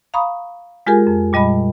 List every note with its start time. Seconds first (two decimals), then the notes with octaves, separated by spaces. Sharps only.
0.14 F5 A#5 B5 C#6 D#6
0.87 G#3 F4 G4 G#4 A#4 G#5
1.07 F2
1.33 A#2 G3 D#5 A5 B5